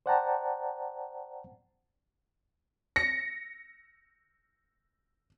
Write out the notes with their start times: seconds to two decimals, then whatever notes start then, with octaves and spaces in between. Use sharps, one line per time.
0.06 C5 D5 F#5 G5 A5 A#5
2.96 A#6 C#7